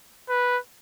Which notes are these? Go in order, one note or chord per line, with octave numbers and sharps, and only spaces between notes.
B4